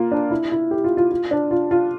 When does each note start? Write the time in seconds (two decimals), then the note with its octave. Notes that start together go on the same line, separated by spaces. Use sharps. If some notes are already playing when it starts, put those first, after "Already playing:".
Already playing: A#3 F4
0.11 D4
0.31 E4
0.52 E4
0.71 G4
0.84 F4
0.97 F4
1.11 F4
1.31 D4
1.51 F4
1.71 F4